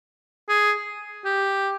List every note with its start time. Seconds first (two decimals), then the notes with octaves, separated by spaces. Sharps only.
0.49 G#4
1.25 G4